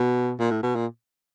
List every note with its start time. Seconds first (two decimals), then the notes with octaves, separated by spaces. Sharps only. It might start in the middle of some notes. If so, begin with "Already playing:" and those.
Already playing: B2
0.39 A#2
0.51 A2
0.63 B2
0.75 A#2